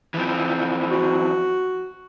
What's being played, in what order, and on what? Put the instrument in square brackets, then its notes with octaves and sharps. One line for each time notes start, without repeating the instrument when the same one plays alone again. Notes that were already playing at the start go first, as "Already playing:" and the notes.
[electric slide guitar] E3 F3 C4
[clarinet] F#4